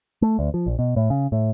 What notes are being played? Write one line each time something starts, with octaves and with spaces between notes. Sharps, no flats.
A3
D2
F3
A#1
B2
A2
C#3
A2